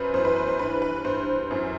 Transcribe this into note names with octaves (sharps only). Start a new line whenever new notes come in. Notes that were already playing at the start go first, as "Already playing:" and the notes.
Already playing: F#2 B4 C5
F#2 E3 C5
B4
C5
C5
G2 E3 B4
B4
G2 E3 C5
F#2 E3